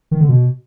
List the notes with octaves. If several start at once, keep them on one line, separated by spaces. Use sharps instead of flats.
D#3
D3
B2